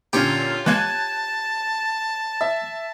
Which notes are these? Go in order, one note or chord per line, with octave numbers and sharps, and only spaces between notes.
A#2 D3 C#4 F4 G4 C#5
E3 G#3 A#3 A5 F#6 G#6 D#7
E5